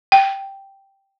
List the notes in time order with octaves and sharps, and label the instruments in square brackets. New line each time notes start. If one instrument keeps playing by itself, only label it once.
[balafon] G5